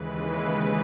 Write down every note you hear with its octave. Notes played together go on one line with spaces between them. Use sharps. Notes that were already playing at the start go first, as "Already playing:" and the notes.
Already playing: D#2 C#3 E3 G#3 B4